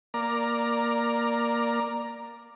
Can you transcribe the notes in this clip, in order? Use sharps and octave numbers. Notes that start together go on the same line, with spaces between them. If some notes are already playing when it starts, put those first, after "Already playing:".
A#3 D5 A#5